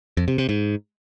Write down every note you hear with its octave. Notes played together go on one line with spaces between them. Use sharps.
F2
C3
C3
G#2